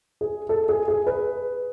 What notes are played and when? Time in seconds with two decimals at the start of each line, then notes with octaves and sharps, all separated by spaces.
0.21 G#4
0.49 A4
0.69 G#4
0.88 G#4
1.07 B4